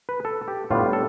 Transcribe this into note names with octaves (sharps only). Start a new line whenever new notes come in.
B4
A4
G4
A2 G3 B3 D4 F4
A4